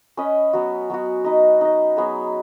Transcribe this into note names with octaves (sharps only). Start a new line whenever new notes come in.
C#4 B4 D#5
F#3 B3 F#4
F#3 B3 F#4
D#4 B4 D#5
D#4 B4 D#5
F#3 B3 G#4 B4